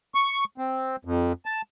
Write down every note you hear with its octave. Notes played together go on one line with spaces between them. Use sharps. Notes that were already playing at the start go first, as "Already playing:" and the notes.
C#6
C4
F2
A5